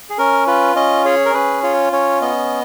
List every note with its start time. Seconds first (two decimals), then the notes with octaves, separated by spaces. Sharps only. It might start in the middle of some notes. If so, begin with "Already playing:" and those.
0.10 G#4
0.18 C#4 A#4
0.47 F4 B4
0.76 C#4 D#5
1.05 G#4 C#5
1.25 A#4
1.34 C#4 B4
1.63 F4 C#5
1.92 C#4 C#5
2.21 B3 D#5